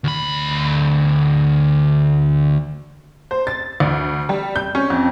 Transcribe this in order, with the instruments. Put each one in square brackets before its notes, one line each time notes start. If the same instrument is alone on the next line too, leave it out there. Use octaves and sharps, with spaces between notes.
[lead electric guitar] D2 B5
[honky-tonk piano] C5
A6
D2
G3
G6
C#4
F2